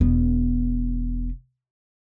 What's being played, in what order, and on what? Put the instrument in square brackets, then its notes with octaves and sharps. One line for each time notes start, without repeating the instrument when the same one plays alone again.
[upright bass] E1 B3